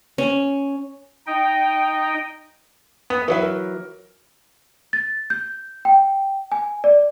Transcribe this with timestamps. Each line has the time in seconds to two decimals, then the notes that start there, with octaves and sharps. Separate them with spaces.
0.18 C#4
1.27 D#4 D#5 G5
3.10 B3 D#6
3.28 E3 F#3 B4 E5
3.42 A#4
4.93 A6
5.30 G6
5.85 G5
6.52 G#5
6.84 D5